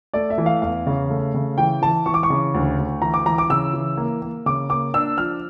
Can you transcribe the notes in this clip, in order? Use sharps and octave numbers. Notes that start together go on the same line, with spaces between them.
A3 D5
E5
E3
F5
E2 F5
C#3
A3
C#3
E3 G5
E3 A5
E3 C#6
D6
C#6
C#3
D2
D2
E3 A#5
D6
E3 A#5
D6
C#3 E6
E3
A#3
A#3
C#3 D6
A#3 D6
D4 E6
F3 F6